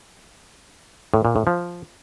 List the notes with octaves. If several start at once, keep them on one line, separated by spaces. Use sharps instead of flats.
A2
A#2
A2
F3